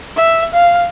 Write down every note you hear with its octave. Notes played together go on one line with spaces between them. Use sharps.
E5
F5